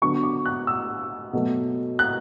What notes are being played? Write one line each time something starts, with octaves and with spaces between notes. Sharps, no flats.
D3 F#3 B3 D4 C#6
D6
F#6
E6
B2 F#3 A3
F#6